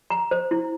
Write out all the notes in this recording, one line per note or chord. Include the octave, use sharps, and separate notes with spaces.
A#5
C5
E4